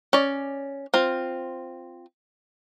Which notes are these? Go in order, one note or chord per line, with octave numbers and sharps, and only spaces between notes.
C#4 D5
C4 F4